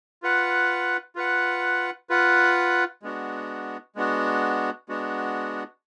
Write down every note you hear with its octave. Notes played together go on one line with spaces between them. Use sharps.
F4 B4 F#5
F4 B4 F#5
F4 B4 F#5
G#3 B3 D4 F#4
G#3 B3 D4 F#4
G#3 B3 D4 F#4